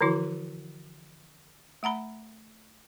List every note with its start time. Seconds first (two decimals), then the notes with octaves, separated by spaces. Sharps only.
0.01 D3 E3 F3 E4 F#4
1.83 A3 F#5 A#5 B5